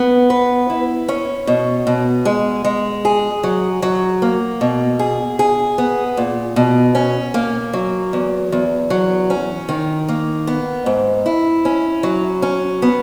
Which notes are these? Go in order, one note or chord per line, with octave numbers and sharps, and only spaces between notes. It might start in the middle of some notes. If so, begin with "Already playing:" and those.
Already playing: B3
B4
E4
C#4
B2
B2
G#3
G#3
G#4
F#3
F#3
A#3
B2
G#4
G#4
B3
A#2
B2
C#4
A#3
F#3
E2
E2
F#3
C#4
D#3
A#3
B3
G#2
E4
C#4
F#3
C#4
B3